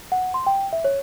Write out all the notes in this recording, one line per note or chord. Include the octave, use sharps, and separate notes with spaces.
F#5
C6
G5
E5
C#5